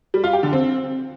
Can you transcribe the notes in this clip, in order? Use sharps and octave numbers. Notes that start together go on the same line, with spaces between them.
G3
F4
G4
D3
C4